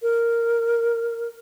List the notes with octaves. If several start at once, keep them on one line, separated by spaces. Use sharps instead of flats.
A#4